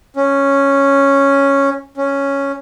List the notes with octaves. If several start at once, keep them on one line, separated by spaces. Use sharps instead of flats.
C#4
C#4